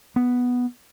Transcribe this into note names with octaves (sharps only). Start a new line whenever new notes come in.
B3